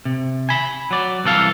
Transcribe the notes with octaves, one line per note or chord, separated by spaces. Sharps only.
C3
G#5 B5
F#3 D5
C2 E3 A4 F5